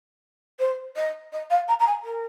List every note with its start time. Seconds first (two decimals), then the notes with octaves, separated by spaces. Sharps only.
0.59 C5
0.96 D#5
1.32 D#5
1.50 F5
1.68 A#5
1.79 A#5
1.87 G#5
2.04 A#4